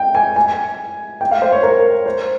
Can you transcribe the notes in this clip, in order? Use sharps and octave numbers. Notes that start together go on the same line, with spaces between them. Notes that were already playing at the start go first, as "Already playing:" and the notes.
Already playing: G5
G#5
G#5
G5
F5
C5
C#5
A#4
C5